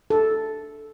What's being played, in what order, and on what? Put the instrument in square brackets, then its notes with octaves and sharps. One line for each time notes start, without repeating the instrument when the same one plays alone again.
[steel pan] A4